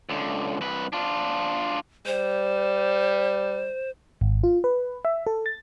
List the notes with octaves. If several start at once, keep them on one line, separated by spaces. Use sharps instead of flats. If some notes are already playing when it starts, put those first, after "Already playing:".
C#2 D3
C2 B4
D4 F4
G3 C5
G#1
F4
B4
E5
A4
A6